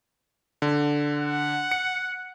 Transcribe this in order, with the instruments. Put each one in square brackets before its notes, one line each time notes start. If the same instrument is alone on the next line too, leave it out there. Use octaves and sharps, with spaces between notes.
[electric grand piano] D3
[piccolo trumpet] F#5
[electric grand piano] C#7